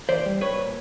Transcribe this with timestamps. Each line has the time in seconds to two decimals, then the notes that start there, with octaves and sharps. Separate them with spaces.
0.09 E3 C5 D5
0.26 G3
0.41 B1 B4 C#5
0.57 A#2